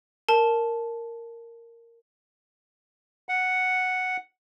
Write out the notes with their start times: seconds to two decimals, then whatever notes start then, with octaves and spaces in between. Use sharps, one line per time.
0.28 A#4 A5
3.29 F#5